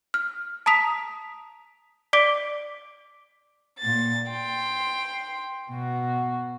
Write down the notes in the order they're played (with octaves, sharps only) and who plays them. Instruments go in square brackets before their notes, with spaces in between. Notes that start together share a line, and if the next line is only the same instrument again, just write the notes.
[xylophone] F6
A5 A#5 D#6 B6 F7
D5 D6 B6 D7 G7
[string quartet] A#2 A6
G5 C6
B2 F#4